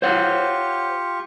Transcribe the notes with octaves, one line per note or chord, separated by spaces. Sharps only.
F4 G4 C5 C#5 F#5 C#6